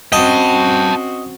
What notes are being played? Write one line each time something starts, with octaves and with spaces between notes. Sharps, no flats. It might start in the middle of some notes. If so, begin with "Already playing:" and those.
C4 C#4 F#4 D#5 G5 A5